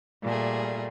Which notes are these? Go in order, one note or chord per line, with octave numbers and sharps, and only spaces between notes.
A#2 G3 A3 G#4